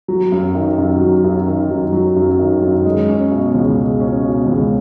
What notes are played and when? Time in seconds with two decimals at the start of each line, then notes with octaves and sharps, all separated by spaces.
0.08 F#3
0.32 F#2
0.55 D#3
0.78 F#2
1.01 F#3
1.24 F#2
1.47 D#3
1.70 F#2
1.93 F#3
2.16 F#2
2.39 D#3
2.62 F#2
2.85 G#3
3.08 C#4
3.31 B2
3.54 C#2
3.77 G#3
4.00 C#4
4.23 B2
4.46 C#2